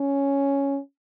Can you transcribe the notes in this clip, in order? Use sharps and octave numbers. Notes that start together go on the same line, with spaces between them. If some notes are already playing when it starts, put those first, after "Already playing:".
Already playing: C#4